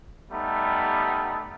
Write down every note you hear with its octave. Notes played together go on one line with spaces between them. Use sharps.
G3 A3 B3 D#4